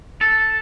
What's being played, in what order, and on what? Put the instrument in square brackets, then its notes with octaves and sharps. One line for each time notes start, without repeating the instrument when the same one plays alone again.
[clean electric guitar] A4